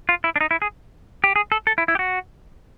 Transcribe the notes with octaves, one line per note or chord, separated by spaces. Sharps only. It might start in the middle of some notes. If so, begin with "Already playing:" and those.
F4
E4
D4
D#4
E4
G#4
G4
G#4
A4
A4
E4
E4
G4
F#4